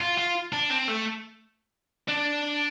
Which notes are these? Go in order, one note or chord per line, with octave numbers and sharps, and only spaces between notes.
F4
F4
D4
C4
A3
D4